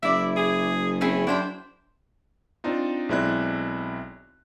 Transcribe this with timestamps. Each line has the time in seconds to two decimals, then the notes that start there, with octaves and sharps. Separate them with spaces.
0.03 F#1 E4 D5 E5
0.37 G#4
1.01 C4 C#4 E4 G#4
1.27 F#2 D4 E4 C5 G5
2.64 C4 D4 D#4 F4
3.09 B1 G#3 C4 E4 D5 F#6